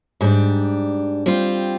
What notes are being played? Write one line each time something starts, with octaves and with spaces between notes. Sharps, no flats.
G#2 G3 D4
G3 C4 F4